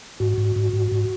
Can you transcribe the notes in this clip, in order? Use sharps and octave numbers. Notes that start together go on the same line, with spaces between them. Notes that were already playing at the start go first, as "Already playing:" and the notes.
G#2 F#4
G#2
G#2
G#2
G#2